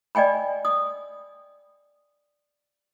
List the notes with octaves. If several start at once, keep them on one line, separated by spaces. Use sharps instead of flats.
D5 D#5 G5 G#5 B5
D#6